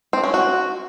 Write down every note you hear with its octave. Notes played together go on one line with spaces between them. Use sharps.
C4
C#4
F#4